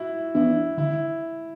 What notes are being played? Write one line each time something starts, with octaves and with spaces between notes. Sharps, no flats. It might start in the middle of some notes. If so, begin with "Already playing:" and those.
Already playing: E4 F#4
E3 B3 D4 E4
D3 E4